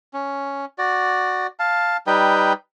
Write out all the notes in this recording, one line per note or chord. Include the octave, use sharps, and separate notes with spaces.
C#4
F#4 D5
F5 A5
G3 D#4 B4 G5